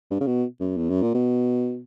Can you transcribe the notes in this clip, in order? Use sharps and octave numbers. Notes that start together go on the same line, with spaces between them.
G2
C#3
B2
F#2
E2
F#2
A#2
B2